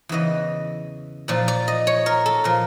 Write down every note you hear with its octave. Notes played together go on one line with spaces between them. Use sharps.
E2 C#3 E3 D#5
A#2 F3 D5
D5
D#5
C#5
A#4
A4
A#2 F3 A#4